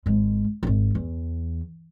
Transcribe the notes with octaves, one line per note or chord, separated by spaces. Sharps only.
G#1 G#3
D#1 G#1
E2